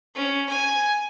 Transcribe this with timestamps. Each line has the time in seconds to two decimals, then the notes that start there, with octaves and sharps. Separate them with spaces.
0.15 C#4
0.49 G#5